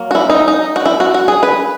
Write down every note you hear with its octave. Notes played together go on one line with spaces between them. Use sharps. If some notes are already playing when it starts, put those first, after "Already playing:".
Already playing: F#3 A#3
F#4
E4
D#4
D#4
F#4
E4
F#4
F#4
G#4
B4